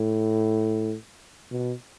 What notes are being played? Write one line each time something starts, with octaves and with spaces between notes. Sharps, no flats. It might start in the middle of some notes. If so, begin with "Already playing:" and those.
Already playing: A2
B2